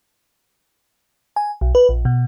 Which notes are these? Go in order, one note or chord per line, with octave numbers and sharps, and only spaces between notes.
G#5
B1
B4
A#1
B2